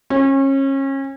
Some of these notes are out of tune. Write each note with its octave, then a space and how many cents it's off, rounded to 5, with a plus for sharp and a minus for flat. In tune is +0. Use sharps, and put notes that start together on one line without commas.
C#4 -30